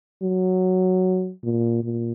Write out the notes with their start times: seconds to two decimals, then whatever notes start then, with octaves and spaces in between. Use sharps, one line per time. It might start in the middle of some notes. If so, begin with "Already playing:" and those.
0.22 F#3
1.44 A#2
1.83 A#2